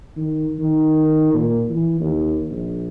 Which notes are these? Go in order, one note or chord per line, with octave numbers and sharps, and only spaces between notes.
D#3
D#3
A#2
E3
D#2
A#1